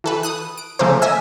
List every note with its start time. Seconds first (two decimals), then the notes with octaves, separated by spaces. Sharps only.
0.04 E3 A4 B4
0.23 D#6 F#6
0.58 D7
0.79 C#3 F3 A3 A#3 A#4 C5
1.02 D#5 E5 G#5 E6